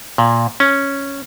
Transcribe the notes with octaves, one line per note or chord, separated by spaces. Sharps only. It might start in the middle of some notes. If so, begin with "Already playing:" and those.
A#2
C#4